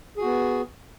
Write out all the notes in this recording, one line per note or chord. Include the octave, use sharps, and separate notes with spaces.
B3 F#4 G#4